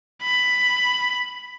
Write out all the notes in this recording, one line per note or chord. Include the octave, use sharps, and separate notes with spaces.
B5